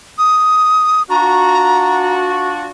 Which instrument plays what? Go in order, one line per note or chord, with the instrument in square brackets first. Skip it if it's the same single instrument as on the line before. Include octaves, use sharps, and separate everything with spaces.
[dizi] D#6
[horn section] D4 F4 F#4 [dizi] A#5